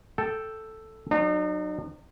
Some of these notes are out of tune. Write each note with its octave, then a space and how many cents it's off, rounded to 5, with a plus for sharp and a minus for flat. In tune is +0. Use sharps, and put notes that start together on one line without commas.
A4 +0 G5 +0
F#3 +0 D#4 -40